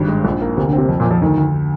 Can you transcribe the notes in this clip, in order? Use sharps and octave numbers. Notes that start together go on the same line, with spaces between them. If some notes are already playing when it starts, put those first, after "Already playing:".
Already playing: G#1 G2
G#3
A#1
A#3
D2 C3
D3
C4
C3
F2
A#2
F2
F3
D2 D#3
D2